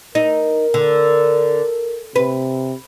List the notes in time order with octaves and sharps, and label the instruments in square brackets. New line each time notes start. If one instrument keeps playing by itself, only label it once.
[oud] D#4 [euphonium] A#4
[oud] D3
[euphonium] C3 [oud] B4